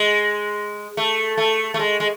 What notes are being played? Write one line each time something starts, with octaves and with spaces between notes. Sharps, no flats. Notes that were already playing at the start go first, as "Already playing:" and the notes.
Already playing: G#3
A3
A3
A3
G#3
G#3